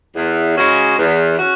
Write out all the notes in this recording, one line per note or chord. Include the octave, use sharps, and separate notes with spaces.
E2
C#3 G#3 C#4 F#4
E2
C#4 F#4